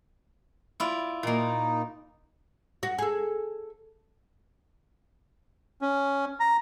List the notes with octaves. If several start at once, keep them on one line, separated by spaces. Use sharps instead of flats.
E4 F4 D5
A#2 A#3 D#4
F#4
G#4 A4
C#4
A#5